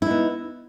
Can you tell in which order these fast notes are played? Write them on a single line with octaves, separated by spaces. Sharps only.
E4 D#4 B3